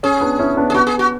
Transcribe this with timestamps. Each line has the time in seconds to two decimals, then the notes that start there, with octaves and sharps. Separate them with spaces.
0.03 C#4 G#4
0.20 B3 D4
0.39 C#4 E4
0.57 B3 D4
0.70 G#4
0.74 B3 F#4
0.87 G#4
0.99 F#4